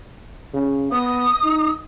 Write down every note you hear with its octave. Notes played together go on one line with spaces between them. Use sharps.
C#3
B3 D#6
D#4